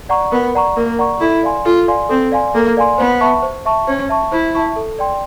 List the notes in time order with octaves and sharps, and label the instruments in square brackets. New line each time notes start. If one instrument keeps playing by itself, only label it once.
[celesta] D5 F#5 A#5 C#6
[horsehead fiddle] B3 [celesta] A#4
[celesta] D5 F#5 A#5 C#6
[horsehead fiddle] A#3 [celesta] A#4
[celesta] D5 F#5 A#5 C#6
[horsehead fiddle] E4 [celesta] A4
[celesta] D5 F5 G#5 C6
[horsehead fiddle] F4 [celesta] A4
[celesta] D5 F5 G#5 C6
[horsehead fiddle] C4 [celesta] A4
[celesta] D5 F5 G#5 C6
[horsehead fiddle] A#3 [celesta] A4
[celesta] D5 F5 G#5 C6
[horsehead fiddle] B3 [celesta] C5
[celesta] E5 A5 C#6
C5
E5 A5 C#6
[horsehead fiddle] C#4 [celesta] C5
[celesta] E5 A5 C#6
[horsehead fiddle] E4 [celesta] C5
[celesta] E5 A5 C#6
A4
D5 G5 C6